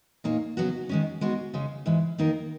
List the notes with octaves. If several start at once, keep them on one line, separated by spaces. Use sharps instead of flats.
A#2 A#3 D#4 A#4 C#5
C#3 F#3 B3 F#4
D#3 G#3 C#4
G#3 B3 D#4 F#4
C#3 G#3 C#4
G#2 E3 G#3
D#3 A#3 D#4 A#4